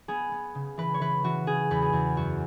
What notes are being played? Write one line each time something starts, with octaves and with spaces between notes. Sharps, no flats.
B3 G#4
B3
C#3
E3 B4
C#5
E3 B4
E3 F#4
C#3 G#4
E2 B4
G#4
E2
F#2 F#4